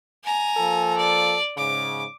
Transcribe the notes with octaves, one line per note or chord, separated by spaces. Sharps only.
G#5 A#5
F3 A#3 A4
D5
G#2 C#3 D6